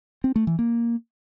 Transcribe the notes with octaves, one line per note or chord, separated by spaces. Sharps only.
C4
A3
E3
A#3